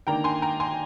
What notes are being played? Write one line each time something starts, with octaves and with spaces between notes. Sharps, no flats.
D#3 A#3 D4 G5 A#5
G#5 C6
G5 A#5
G#5 C6